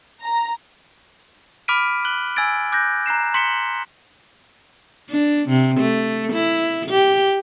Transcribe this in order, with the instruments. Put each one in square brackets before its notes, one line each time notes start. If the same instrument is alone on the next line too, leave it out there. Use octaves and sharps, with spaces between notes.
[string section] A#5
[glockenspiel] B5 D6 F6 B6 D7 D#7
F#6 F#7 G7
G#5 E6 G#6 A6 D7
D6 F#6 G6 A#6
A#5 F#6 C7 E7
C6 B6 C#7 E7 F#7 G7
[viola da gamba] D4
C3
A3
E4
G4